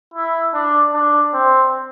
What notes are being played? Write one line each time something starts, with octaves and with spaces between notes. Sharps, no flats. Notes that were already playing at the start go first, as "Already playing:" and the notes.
E4
D4
D4
C4